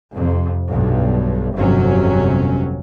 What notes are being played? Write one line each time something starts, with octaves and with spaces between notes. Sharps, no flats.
F2 C3
B1 G2
G1 F2 C3 F#3 C#4